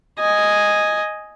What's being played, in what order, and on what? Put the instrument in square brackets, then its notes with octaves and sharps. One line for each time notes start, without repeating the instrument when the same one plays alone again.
[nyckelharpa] D#5 G#5